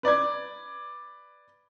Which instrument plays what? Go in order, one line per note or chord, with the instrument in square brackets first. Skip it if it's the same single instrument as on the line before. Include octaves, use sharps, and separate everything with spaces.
[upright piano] B4 D5 D6 G#6